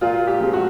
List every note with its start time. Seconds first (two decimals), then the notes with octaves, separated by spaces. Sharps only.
0.01 A#2 F4
0.27 G4
0.40 F3 G#3 C4
0.53 F#4